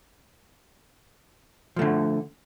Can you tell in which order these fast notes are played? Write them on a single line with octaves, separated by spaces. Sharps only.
F3 A3 D3